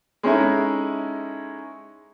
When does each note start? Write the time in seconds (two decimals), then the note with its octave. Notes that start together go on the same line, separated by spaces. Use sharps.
0.23 G#3 C#4 D#4 E4 A4